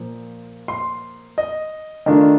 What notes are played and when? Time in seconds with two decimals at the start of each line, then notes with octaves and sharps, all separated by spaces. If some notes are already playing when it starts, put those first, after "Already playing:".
Already playing: A#2 F3
0.68 C6
1.38 D#5
2.06 D#3 A3 D4 F4